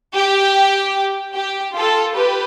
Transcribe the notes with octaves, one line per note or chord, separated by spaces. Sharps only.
G4
G4
F4 A4
G4 B4